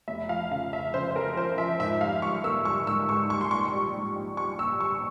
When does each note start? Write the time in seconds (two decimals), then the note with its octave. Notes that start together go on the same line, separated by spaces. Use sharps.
0.08 F1 E5
0.29 F3 F5
0.51 C#3 F5
0.72 F2 E5
0.94 C#3 C5
1.11 C5
1.16 F2 A#4
1.36 F3 C5
1.58 F3 E5
1.80 G#2 E5
2.01 G3 F5
2.22 G3 C#6
2.44 A#3 E6
2.65 G3 C#6
2.87 G#2 E6
3.09 G#2 C#6
3.30 G3 C#6
3.41 C6
3.51 A#1 C#6
3.74 G3
3.94 G#2
4.16 A#1
4.37 G3 C#6
4.59 A#1 E6
4.80 G3 C#6